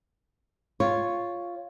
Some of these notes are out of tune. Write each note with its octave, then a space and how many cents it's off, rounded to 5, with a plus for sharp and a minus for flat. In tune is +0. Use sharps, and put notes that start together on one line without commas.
F4 +0 C#5 +0